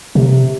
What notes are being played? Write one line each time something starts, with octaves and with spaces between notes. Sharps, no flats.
C3